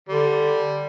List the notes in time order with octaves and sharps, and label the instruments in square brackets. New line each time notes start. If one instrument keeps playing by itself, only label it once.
[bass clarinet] D3 [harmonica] G3